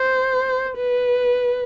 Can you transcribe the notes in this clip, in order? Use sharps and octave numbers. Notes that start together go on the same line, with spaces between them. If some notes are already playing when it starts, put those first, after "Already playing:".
Already playing: C5
B4